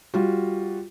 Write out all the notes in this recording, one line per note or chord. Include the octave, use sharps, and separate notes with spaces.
G3 F4 F#4